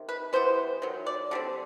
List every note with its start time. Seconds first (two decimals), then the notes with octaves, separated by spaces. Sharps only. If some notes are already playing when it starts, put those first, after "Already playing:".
Already playing: C3 D#3
0.09 B4
0.33 E3 G3 B3 C5
0.82 D#3 F#3
1.06 D5
1.31 D3 G3 C4